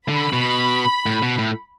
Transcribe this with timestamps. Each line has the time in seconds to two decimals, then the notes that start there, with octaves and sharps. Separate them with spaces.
0.09 D3 B5
0.33 B2
1.06 A2
1.23 B2
1.39 A2